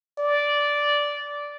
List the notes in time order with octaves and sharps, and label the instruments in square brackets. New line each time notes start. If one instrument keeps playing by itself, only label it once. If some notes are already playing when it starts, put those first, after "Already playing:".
[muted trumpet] D5